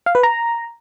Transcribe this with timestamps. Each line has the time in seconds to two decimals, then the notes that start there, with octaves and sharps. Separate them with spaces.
0.06 F5
0.15 B4
0.23 A#5